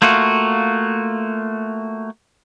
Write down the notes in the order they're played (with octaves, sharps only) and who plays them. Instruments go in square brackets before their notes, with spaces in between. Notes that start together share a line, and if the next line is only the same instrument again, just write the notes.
[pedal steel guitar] A3 A#3 F4 F#4